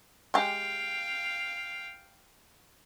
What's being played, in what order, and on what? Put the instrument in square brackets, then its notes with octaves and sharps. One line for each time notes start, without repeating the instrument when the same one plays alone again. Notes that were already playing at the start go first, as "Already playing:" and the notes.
[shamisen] G#3 G4 [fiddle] F5 G5